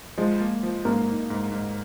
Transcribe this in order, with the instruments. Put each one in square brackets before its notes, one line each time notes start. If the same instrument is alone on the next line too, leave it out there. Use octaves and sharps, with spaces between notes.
[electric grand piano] F3 [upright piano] G#3
[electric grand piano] A#3
F3
[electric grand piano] G#2 [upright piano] A#3
[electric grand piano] D#4
G#2
G#2